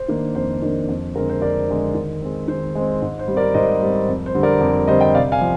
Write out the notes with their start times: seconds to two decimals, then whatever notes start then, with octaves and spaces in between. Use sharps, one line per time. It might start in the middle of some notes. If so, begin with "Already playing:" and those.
Already playing: C5
0.08 D#3 A#3 D4
0.35 F2 C5
0.62 D#3 A#3 D4
0.89 F2
1.16 D3 G#3 C4 A#4
1.29 C5
1.42 F2 A#4 D5
1.69 D3 G#3 C4
1.95 D#3
2.22 G#3 C4
2.48 D#3 C5
2.75 G#3 C4
3.02 G#2
3.19 C5
3.28 G3 C4
3.37 A#4 D5
3.54 G#2 C5 D#5
3.81 G3 C4
4.09 F2
4.26 C5
4.35 D3 G3 C4
4.43 A#4 D5
4.61 F2
4.87 D3 G3 C4 C5 D#5
5.01 D#5 G5
5.15 C3 D5 F5
5.32 F5 G#5
5.41 F3